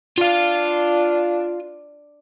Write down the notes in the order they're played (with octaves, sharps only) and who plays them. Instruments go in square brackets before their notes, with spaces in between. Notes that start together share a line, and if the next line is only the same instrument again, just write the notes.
[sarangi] D4 [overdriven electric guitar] F4 F5